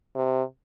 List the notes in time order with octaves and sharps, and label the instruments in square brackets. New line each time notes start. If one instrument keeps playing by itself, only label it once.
[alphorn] C3